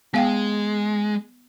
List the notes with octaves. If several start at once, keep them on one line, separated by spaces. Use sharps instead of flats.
G#3 B3 F5 G5